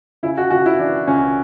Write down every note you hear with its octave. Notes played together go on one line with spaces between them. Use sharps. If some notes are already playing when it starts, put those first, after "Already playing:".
C#3 E4
F#4
C#3 F#4
E4
E3 D4
C#2 C#4